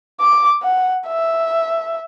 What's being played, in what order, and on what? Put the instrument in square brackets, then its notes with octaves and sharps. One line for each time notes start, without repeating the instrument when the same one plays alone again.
[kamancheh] D6
F#5
E5